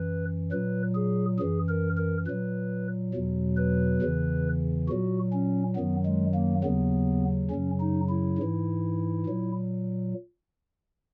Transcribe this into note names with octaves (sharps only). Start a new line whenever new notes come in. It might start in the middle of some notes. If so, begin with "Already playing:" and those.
Already playing: F#2 E3 B4
A#2 F#3 B4
G#4
F#2 E3 G#4
A#4
A#4
A#2 F#3 B4
E2 B2 F#3
B4
E2 C#3 E3
A#2 F#3 F#4
C#4
F#2 D#3 F#3 B3
G#3
A#3
D#2 C#3 F#3 B3
F#2 C#3 F#3 C#4
D#4
E4
G#2 E3
A#2 F#3